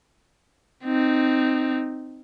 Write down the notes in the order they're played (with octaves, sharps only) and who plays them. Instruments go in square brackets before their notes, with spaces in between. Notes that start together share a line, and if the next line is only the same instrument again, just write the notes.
[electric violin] C4 D#4